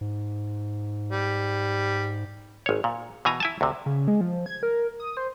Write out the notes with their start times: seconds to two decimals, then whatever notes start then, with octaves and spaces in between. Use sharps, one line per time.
0.01 G#2
1.12 G3
2.66 G#1 C#5
2.84 A#2
3.25 B2 E3 G#5 A#5
3.40 E4 G#5 A5
3.61 D2 C3
3.86 C#3
4.08 G#3
4.21 F3
4.46 G#6
4.63 A#4
5.00 D#6
5.17 C5